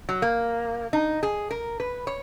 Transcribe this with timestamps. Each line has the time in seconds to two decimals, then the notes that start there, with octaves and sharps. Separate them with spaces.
0.09 F#3
0.22 A#3
0.93 D#4
1.23 G#4
1.51 A#4
1.80 B4
2.07 C#5